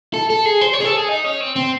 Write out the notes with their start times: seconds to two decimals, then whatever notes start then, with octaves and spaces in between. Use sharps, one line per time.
0.14 A4
0.30 A4
0.45 G#4
0.61 C5
0.73 C#5
0.80 G#4
0.85 A4
0.97 G#4
1.09 D#4
1.24 C#4
1.41 C4
1.56 C4